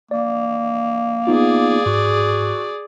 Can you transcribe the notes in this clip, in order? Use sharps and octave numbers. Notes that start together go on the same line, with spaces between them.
A#3 D5
B3 D#4 F4 G#4 D5
G#2 F#4